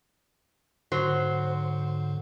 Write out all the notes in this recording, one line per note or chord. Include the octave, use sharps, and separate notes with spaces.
G#2 D3 F#3 C5